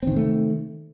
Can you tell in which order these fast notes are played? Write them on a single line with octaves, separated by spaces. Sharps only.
C4 D#3 C3 A3